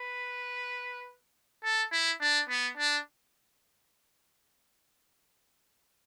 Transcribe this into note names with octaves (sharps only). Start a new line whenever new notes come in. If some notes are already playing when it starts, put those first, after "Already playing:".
Already playing: B4
A4
E4
D4
B3
D4